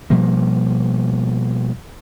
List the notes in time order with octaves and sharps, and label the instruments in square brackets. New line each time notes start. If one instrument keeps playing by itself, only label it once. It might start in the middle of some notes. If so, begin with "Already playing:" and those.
[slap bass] B2 F3 G3 A#3